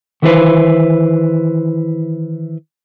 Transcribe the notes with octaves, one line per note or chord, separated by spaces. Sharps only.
D#3 E3 E4 G#4 B4 C5